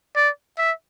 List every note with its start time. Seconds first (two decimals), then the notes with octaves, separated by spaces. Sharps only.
0.16 D5
0.58 E5